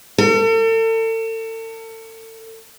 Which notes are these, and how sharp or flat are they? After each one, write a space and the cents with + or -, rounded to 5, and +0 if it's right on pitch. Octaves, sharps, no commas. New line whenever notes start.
A4 +40